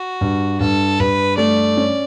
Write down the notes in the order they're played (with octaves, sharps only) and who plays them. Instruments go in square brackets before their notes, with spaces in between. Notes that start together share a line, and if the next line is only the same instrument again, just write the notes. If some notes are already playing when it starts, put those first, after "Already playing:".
Already playing: [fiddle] F#4
[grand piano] G2
[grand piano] G2 [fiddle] A4
[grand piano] G2 [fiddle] B4
[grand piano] A3 [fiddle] D5
[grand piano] C#4